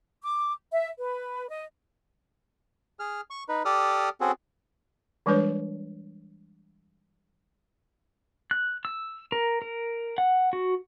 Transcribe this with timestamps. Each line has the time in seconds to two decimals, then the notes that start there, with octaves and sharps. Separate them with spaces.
0.22 D6
0.71 E5
0.98 B4
1.49 D#5
3.00 G#4 F6
3.30 C#6
3.49 D#4 B4
3.65 G4 A4 D5 D#6 F6
4.21 C4 C#4 F#4 G#4 A4
5.26 E3 G3 G#3 D4 B4 C#5
8.51 F#6
8.85 E6
9.32 A#4
9.62 A#4
10.18 F#5
10.53 F#4